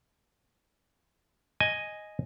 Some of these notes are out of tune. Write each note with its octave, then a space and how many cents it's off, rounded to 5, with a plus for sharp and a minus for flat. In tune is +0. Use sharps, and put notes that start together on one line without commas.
D#5 +0 G#5 +0